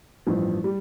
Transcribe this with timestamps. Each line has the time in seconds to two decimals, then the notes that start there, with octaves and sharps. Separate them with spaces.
0.27 A1 G2 F3
0.64 G3